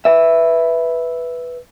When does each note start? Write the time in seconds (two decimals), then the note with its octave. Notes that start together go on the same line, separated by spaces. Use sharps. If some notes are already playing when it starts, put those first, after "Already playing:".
0.05 B4 E5